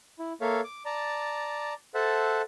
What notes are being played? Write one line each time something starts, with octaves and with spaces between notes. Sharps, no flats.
E4
A#3 A4 C#5 E5 F5
D6
D5 A5 A#5
A4 C5 E5 F#5 A5